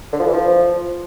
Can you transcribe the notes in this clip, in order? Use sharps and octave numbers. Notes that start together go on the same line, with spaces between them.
D3
F3
E3
F3